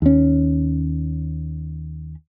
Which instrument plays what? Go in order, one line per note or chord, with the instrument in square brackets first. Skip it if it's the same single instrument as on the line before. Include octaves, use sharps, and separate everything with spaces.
[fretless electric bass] D#2 C#4